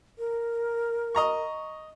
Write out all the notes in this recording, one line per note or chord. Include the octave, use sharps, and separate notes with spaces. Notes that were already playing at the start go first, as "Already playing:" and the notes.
A#4
D#5 A#5 C#6